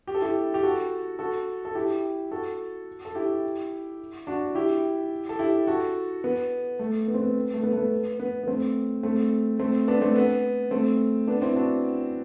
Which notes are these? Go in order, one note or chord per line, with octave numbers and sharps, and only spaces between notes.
G4
A4
E4 G4
G4
F#4 A4
F#4 A4
A4
E4 G4
F#4 A4
A4
E4 G4
D4 F#4
E4 G4
A4
E4 G4
F#4 A4
B3
A3
B3
C4
B3
A3
B3
A3
B3
B3
B3
A3 C4
A3 C4
A3 C4
B3 D4
A3 C4
B3
A3 C4
B3 D4
C4 E4
D4 F#4